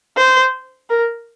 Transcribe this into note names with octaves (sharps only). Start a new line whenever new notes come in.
C5
A#4